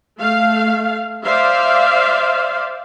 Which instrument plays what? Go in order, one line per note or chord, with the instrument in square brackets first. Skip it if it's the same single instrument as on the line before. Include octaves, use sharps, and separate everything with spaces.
[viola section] A3 F5
C5 D5 E5 F5